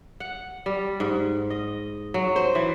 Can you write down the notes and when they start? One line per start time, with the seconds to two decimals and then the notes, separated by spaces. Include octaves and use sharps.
0.20 F#5
0.66 G3
1.00 G#2
1.50 D#5
2.14 F#3
2.36 C5
2.55 E3